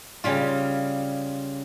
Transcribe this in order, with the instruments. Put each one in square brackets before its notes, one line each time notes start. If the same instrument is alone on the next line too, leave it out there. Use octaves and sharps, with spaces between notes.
[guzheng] C#3 G3 F4